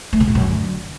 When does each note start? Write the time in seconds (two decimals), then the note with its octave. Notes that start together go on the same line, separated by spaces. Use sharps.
0.13 A3
0.20 C#3
0.28 A#2
0.35 F#2
0.42 D3